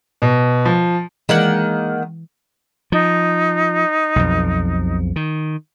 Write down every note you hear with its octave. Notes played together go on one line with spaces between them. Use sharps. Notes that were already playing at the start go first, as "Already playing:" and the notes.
B2
F3
D#3 E3 G#3 A#3 F#5
F3 D#4
B1 F2
D#3